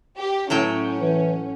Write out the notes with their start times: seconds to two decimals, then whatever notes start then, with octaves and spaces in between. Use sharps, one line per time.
0.19 G4
0.50 A2 F#3 C#4 E4 G5
1.00 E3